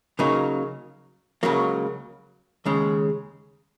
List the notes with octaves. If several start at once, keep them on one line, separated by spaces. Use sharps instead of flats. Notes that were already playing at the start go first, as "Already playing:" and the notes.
C#3 F#3 A#3 D#4
C#2 C#3 F#3 A#3
D#2 C#3 G#3 C#4